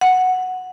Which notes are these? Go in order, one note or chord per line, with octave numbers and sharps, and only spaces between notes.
F#5